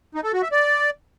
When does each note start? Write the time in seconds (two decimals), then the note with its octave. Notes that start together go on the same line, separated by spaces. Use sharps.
0.15 D#4
0.24 A4
0.33 F#4
0.43 E5
0.52 D5